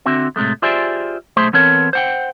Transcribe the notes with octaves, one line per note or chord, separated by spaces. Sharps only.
D3 C4 F#4 E5
A2 C3 G#3 A3
F4 G4 G#4 C5 D5 E5
B1 A3 G#4 C5 E5 C6
E3 B3 C4 A4 A#4 C#5
C5 F#5 G5